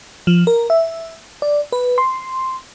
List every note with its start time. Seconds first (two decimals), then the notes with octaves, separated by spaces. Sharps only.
0.27 F3
0.47 A#4
0.70 E5
1.42 D5
1.72 B4
1.98 C6